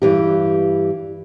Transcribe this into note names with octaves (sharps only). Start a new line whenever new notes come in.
G2 E3 G4